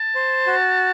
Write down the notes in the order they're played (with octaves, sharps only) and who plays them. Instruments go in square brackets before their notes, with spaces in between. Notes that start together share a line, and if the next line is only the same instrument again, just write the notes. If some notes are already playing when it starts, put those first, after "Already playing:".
Already playing: [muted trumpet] A5
[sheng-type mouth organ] C5
F#4